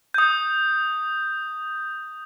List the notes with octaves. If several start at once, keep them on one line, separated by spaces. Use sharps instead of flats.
D#6 G6